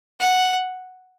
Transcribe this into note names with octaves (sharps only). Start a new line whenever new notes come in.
F#5